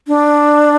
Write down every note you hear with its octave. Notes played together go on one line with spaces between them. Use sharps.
D4